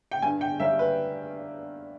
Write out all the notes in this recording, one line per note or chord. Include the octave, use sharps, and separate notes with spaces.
G5
G2 G#5
G5
G3 A#3 C#4 E5
B4